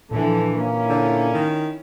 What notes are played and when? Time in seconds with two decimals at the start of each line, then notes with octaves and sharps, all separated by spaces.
0.11 A#2 D3 E3 F3 A4
0.53 A#3 C#4 E4
0.89 D3
1.34 D#3